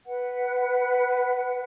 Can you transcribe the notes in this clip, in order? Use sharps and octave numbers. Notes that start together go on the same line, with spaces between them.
B4 F#5